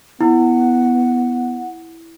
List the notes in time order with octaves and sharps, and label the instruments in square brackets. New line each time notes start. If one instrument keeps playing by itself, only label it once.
[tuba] B3 [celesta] E4 [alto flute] F#5